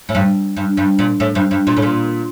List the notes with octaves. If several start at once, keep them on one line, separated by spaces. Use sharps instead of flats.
A2
G2
G2
G2
A#2
A2
G2
G2
A#2
A2
A#2